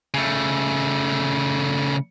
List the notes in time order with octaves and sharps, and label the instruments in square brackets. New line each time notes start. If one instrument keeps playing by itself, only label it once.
[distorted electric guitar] C#3 A3